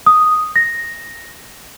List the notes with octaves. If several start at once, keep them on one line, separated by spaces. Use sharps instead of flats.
D#6
A#6